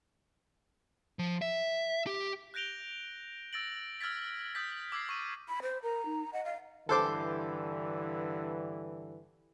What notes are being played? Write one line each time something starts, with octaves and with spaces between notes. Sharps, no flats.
F3
E5
G4
F#6 G6 A#6 D7 F7 G7
E6 A6 A#6 D7 F#7
E6 F6 G#6 A6 B6
D#6 E6 G6 A6 B6
D6 E6 G#6 B6 C7
C#6 D#7
B5
C5
A#4 A#5
D#4
D#5 F#5
F5
G2 D3 E3 A4 C5 D6